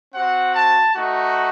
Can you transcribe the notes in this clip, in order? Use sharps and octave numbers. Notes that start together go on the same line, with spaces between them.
C4 F#4 F#5
A5
A3 D#4 F#4